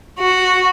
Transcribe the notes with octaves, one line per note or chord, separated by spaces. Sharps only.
F#4